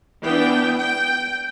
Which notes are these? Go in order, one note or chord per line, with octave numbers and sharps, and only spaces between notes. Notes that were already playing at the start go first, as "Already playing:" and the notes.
E3 B3 D4 G5
G5